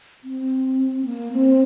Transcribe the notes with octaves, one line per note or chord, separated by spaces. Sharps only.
C4
A#3
C4